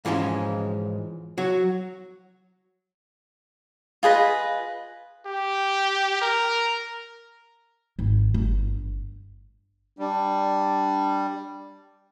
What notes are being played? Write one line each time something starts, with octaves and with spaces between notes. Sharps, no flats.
G#2 E3 F3 G#3 C#4
F#3 F#4 C#5
F4 G#4 B4 D#5
G4
A#4
G#1
G1
G3 D4